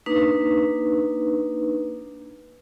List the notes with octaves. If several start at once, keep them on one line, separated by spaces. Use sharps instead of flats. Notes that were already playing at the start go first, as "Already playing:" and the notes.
A#3 D4 D#4 B4